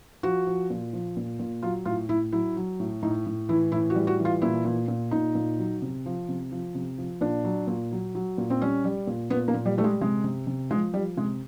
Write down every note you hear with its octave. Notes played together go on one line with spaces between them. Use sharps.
F3 F#4
F3
A#2
F3
A#2
A#2
F#3 F4
A2 F4
A2 E4
F#3 E4
F#3
A2
A2 D#4
A2
E3 E4
A2 E4
F#4
G3
F#4
E3
F4
A#2 E4
A#2
A#2
A#2 D#4
A#2
F#3
C3
F3
C3
F3
C3
F3
A#2 D4
F#3
A#2
F#3
F#3
A#2
C4
G3 C#4
G3
A#2
A#2 B3
A#3
A#2
G3
G3 A3
G#3
C3 G#3
C3
C3
F3 G#3
F3 G3
C3 G#3